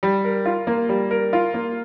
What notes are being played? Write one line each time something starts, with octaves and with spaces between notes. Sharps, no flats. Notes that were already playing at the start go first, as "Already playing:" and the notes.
G3
A#4
F4
A#3
G3
A#4
F4
A#3